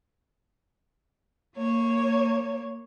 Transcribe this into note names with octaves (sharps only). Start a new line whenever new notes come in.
A#3 C#5